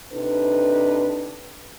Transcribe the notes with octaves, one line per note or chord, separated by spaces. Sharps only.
C3 D4 D#4 A4 B4